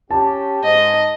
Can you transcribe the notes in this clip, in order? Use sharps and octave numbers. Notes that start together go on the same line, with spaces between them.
C#4 G4 A5
G#2 D#5